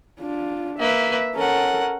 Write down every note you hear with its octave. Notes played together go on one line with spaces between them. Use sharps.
D4 F4
A#3 B4 E5
C#4 A4 A#4 F#5